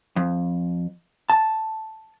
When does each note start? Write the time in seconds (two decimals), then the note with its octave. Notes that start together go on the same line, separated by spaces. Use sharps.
0.16 F2
1.30 A5